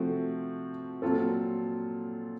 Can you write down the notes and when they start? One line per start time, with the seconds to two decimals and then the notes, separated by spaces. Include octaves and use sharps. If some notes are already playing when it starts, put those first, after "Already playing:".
Already playing: C3 F3 A3 C4 F#4
1.02 A#2 F#3 C4 F4 A4